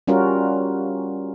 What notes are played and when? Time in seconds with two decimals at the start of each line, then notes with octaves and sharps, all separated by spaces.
0.08 G3 C#4 F4 F#4 A#4